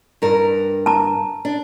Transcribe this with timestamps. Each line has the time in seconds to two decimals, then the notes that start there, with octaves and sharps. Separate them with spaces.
0.22 G2 A#4
0.86 A5 A#5
1.45 D4